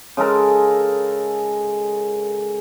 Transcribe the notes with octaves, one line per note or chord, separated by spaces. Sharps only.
C#3 G#3 A4 A#4